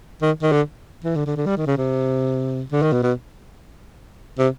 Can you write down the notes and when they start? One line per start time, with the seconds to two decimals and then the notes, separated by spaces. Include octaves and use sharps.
0.22 D#3
0.42 D#3
0.52 D3
1.04 E3
1.16 D3
1.26 D3
1.36 D3
1.46 G3
1.57 D#3
1.67 C#3
1.77 C3
2.72 D3
2.82 D#3
2.93 B2
3.03 B2
4.39 C3